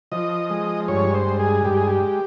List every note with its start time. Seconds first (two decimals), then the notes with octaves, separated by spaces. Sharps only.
0.12 F3 D#5
0.50 G#3
0.88 G2 C#5
1.14 C5
1.27 G#3
1.40 G#4
1.65 G2 G4
1.77 G#4
1.87 G4